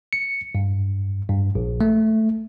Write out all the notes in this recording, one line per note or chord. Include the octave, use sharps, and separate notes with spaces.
C#7
G2
G2
A#1
A3